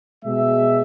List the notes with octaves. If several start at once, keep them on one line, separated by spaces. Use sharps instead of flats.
B2 G#3 E5